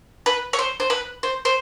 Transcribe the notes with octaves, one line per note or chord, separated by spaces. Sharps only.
B4
C#5
C5
C5
B4
C5
C5